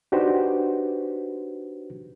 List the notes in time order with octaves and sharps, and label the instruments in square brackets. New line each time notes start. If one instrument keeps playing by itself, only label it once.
[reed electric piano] D4 D#4 F#4 G4 B4 C5